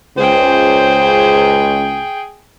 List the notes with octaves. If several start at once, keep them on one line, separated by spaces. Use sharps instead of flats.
C#2 G#4 C5 G5